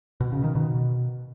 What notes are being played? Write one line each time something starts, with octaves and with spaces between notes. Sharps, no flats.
B2
C#3
D#3
B2